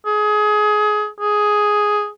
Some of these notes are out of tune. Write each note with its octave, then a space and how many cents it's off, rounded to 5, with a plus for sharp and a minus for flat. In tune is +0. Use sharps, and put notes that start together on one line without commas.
G#4 +25
G#4 +5